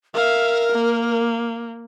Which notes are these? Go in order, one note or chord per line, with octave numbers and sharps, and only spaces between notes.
A#4 E5 F5
A#3